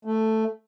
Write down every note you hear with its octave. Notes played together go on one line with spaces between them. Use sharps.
A3